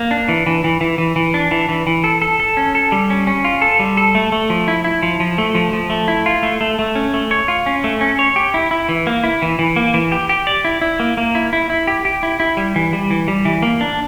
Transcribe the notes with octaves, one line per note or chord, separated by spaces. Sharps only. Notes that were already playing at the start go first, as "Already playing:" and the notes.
Already playing: A#3
D4
E3
E3
E3
E3
E3
E3
D4
E3
E3
E3
A4
A4
A4
C#4
A4
G3
C#4
C#4
F4
A4
G3
A4
A3
A3
F3
E4
E4
F3
F3
A3
F3
F3
A3
E4
F4
A3
A3
A3
C#4
A3
C#5
F4
C#4
A3
C#4
C#5
G4
E4
E4
E3
A#3
E4
E3
E3
A#3
E3
G4
G4
D5
E4
E4
A#3
A#3
E4
E4
E4
G4
G4
E4
E4
G3
E3
G3
E3
G3
E3
A#3
D4